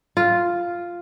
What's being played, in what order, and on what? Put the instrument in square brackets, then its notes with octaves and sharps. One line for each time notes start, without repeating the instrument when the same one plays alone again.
[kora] F4